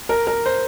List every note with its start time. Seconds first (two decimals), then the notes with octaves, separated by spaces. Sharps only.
0.09 A#4
0.27 A#4
0.46 C5